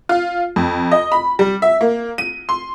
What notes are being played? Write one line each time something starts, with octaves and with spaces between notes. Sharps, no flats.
F4
F2
D#5
B5
G3
E5
A#3
D#7
C6